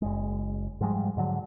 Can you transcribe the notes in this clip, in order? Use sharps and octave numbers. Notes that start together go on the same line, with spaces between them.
F#1 G#3
G#2 F3 G3 G#3
G#2 D3 F#3